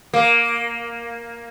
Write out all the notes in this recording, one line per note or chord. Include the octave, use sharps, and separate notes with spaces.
A#3